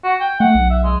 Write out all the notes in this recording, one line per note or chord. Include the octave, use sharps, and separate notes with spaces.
F#4
G5
A3 F#5
B1
E5
G#3